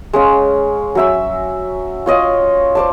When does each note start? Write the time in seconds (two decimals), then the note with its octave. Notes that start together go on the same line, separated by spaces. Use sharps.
0.13 G#3 C#4 F5
0.95 F#3 E5 E6
2.06 F4 C#5 D#5 F5
2.75 C5 D5 A5